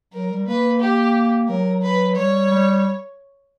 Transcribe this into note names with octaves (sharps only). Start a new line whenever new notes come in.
F#3 A#4
G3
A#3 B4
G4
F#3 A#4
B4
G3 C#5
G3